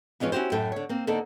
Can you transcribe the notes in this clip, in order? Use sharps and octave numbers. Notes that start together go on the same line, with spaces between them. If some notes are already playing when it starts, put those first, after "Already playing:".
F2 E3 G#3 C#4 F4
C#4 E4 F#4 G4 C5
F#2 A2 E4 A4 G5
D3 C#5
A#3 C4
D3 A#3 D#4 A4 C5